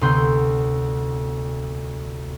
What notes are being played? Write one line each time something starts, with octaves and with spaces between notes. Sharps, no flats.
D2 C3 B3 C6 G6